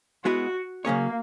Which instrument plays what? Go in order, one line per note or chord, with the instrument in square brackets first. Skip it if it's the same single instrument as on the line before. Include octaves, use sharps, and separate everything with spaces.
[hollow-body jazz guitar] G#3 B3 E4 B4 [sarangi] F#4
[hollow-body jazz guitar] C#3 F#3 C#4 G#4 C#5 [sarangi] A#3